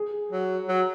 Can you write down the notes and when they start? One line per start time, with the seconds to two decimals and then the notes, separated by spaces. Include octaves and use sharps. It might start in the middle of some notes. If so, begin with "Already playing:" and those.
Already playing: G#4
0.32 F#3
0.68 F#3